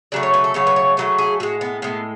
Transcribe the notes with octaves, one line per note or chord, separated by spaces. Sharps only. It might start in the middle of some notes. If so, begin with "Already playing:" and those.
C#3 F#3 A3 D5
C#5
B4
A4
C#3 F#3 A3 C#5
B4
C#5
C#3 F#3 A3 B4
G#4
A2 G#3 F#4
B3
A2 G#3 B3